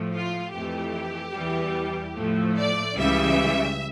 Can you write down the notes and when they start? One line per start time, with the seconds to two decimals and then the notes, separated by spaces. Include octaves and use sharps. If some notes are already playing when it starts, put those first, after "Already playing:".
Already playing: A2 F3 A3
0.13 F4
0.53 F2 E3 A3 G4
1.34 E2 E3 G3
2.16 A2 F3 A3
2.57 D5
2.97 C#2 C#3 E3 G3 E5